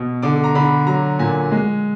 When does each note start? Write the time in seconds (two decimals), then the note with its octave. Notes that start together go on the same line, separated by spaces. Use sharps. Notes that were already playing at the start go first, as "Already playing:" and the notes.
Already playing: B2
0.23 D3 D6
0.44 A#5
0.55 D3 B5
0.87 F#3 A#5
1.19 A#2 G#5
1.52 G#3